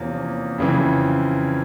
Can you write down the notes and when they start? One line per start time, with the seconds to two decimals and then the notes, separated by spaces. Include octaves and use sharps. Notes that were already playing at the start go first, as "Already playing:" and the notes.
Already playing: E2 C3 F3 A#3 C#4
0.58 F2 C#3 E3